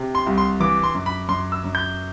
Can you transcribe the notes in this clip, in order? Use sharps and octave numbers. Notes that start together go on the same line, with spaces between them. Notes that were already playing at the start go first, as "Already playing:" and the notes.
Already playing: C3
C6
C2
C6
E3 D6
C6
F#2
B5
F#2 C6
E6
F#2
G6